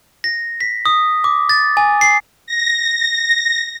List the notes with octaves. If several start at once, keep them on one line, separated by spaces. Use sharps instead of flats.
A#6
B6
D#6
D6
A6
G#5
C7
A#6